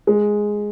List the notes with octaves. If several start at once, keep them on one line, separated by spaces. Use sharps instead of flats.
G#3